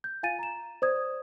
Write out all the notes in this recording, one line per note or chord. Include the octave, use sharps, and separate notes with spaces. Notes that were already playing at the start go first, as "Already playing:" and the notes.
G6
F4 F5 G#5 A6 D#7
A#5 E7
C5 D5 D#6 G#6